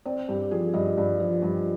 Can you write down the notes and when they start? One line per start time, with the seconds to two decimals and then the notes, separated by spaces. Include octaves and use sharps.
0.06 C4 D5
0.28 G2 G4
0.51 F3 G#4
0.74 G2 D#5
0.97 G2
1.20 F3
1.42 G2